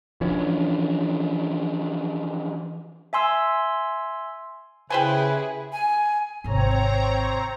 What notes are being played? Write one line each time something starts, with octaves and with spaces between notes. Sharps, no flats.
E3 F3 C#4 D4
E5 G#5 C6 E6
C#3 E4 G4 G#4 B4 C5 G#5
G#5
G#1 C3 C4 C#5 A#5